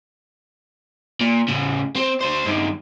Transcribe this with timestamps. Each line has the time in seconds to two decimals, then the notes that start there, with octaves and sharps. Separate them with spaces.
1.21 A#2
1.48 A2 C#3
1.96 C4
2.21 D2 C5
2.46 G2 D#3